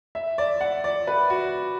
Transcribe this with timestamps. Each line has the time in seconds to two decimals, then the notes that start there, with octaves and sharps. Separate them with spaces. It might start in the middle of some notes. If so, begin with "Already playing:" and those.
0.15 E5
0.38 D5
0.61 F#5
0.84 D5
1.07 B4
1.30 F#4